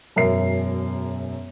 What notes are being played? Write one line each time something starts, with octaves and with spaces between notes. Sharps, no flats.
E1 F#2 A#4 E5 C7